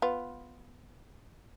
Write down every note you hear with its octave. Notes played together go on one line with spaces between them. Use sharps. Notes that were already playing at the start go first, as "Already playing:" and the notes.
B3 F4